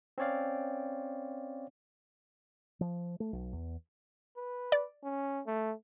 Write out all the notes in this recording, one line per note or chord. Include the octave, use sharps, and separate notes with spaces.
C4 C#4 C#5 D5 F5
F3
A3
B1
E2
B4
D5
C#4
A3